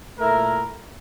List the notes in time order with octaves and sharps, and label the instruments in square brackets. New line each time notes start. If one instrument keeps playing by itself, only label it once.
[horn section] A#2 A3 E4 A#4